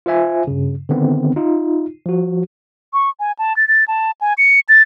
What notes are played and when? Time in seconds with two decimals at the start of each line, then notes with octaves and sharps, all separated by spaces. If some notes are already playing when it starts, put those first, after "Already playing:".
0.06 F4 C5 E5 G#5
0.47 G2 C#3
0.89 D3 D#3 B3 C4
1.36 D#4 F4
2.06 F3 F#4
2.93 C#6
3.20 G#5
3.39 A5
3.57 A6
3.68 A6
3.88 A5
4.21 G#5
4.38 C#7
4.69 A6